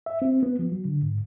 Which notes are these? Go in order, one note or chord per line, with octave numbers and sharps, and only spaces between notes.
E5
C4
B3
F3
F#3
D3
G#2